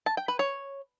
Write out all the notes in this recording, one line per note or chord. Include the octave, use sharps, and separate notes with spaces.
A5
G5
B4
C#5